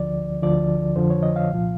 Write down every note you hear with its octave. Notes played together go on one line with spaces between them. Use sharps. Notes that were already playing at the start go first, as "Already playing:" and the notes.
Already playing: D2 D3 F3 D5
D2 D3 F3 D5
F2 D3 F3 C5
C#5
D#5
F5
C2 A#2 F3